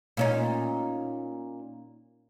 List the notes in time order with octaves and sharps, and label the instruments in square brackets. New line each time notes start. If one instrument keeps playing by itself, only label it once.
[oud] A#2 C#4 D#4